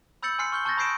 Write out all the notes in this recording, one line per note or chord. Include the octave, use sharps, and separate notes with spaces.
B5 E6 G6 A6 C#7 F#7
G#5 C6 F6 C7 C#7
C#6 F6 G6 G7
A5 C#6 F6 G6 A6 A#6
B5 D#6 G6 C7 D7 E7